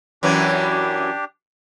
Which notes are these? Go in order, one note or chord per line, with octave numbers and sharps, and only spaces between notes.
F#2 E3 F#3 D4 G4